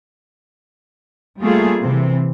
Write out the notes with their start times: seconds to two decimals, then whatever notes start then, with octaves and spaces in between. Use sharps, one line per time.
1.41 G3 A3 A#3 F4 G#4
1.80 C3 E3 C4